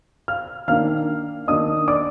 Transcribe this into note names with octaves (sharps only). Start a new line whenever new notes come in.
F5 F6
D#3 A#3 D4 F5 F6
D#3 A#3 D4 D#5 D#6
D5 D6